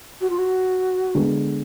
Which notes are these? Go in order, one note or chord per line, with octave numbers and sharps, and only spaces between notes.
F#4
F4
F#4
D3 G#3 B3